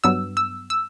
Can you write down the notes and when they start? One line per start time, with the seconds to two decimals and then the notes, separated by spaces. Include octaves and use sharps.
0.04 G2 F#3 B3 E6
0.37 E6
0.70 E6